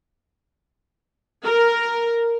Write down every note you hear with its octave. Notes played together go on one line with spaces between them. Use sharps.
A#4